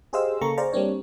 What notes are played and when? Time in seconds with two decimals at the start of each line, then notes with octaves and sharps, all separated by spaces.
0.13 G4 G#4 C5 D#5 F5 E6
0.41 C#3 A#3 A4 A#5 C#6
0.57 G#4 C5 D5 F5 A#5
0.72 G3 A#3 C4 D4 C#5